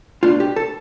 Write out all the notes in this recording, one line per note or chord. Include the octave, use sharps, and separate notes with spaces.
B2 A3 D4 F4
G4
A4